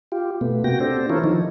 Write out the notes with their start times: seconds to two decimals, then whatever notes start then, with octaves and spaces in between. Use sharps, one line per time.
0.12 F4 G4
0.41 B2 A3 B3
0.64 C3 A#3 F#4 G5 A#6
0.80 C4 D4 G4 A4 C5
1.10 E3 E4 F4 A4 A#4 C#5
1.24 D#3 F3 D#4